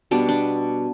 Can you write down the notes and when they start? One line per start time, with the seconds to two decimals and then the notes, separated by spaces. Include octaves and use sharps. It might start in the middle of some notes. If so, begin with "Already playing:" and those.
0.11 B2 G3 B3 D4
0.29 D4